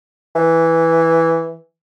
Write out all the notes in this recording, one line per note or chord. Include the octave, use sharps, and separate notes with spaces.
E3